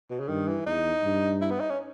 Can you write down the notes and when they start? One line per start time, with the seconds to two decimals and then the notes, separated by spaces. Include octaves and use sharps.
0.11 B2
0.20 C#3
0.28 G2 D#3
0.48 E3
0.66 E2 D#4
1.04 G2
1.41 E4
1.50 B3
1.60 D#4
1.70 C#4